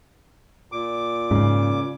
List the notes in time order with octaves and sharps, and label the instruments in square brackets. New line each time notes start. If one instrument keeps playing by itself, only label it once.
[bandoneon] A#2 D6
[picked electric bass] G#2 [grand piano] C#3